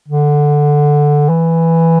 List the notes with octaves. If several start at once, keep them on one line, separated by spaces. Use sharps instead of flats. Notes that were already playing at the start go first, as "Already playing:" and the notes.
D3
E3